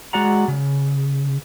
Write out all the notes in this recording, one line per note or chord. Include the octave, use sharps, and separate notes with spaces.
G#3 F#4 D5 F#5 A#5
C#3